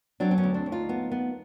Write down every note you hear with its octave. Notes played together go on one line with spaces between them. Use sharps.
F#3 C4 D4
C4
B3 C#4
D2
C4 D4
D2
D#4 F4
B3
B3